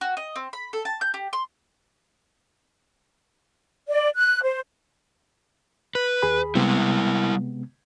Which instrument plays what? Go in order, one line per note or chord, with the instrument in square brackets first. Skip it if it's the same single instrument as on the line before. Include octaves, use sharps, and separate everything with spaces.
[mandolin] F#4
D#5
C4
B5
A4
A5
G6
G4
C6
[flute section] D5
F#6
C5
[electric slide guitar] B4
[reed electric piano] D#2 G#4 B5
[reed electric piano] C3 G#3 B3 [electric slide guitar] G3 E4